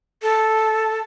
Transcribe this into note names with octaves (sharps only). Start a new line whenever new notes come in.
A4